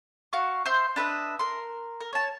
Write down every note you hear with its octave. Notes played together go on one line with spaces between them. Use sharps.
F#4 F5 C#6
C5 E5 C6 G6
D4 B4 D#5 E5
A#4 C6
A#4
C#5 A5